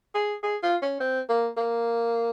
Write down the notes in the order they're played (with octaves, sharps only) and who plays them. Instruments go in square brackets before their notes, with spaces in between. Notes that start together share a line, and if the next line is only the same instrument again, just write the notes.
[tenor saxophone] G#4
G#4
F4
C#4
C4
A#3
A#3